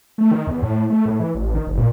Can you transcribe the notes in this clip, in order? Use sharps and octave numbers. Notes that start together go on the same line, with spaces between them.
A3
D#3
E2
A2
A3
A2
E3
A1
D#3
F#1
A#2